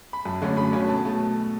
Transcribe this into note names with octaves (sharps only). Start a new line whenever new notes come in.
B5
F#2 A5
D3 F#3 A3 C#4
F#2 B5
D3 F#3 A3 C#4
B2 A5
A3